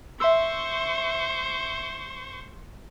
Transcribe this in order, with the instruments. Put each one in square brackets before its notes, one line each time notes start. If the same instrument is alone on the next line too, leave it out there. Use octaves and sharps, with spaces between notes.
[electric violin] C5 C#6 [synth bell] E5 C6 E6